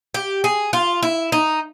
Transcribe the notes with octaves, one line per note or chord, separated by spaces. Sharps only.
G4
G#4
F4
E4
D#4